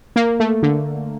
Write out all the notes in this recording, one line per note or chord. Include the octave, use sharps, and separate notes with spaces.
A#3
A3
D3